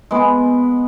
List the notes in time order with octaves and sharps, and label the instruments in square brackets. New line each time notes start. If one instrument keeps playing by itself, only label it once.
[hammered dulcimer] G#3 B3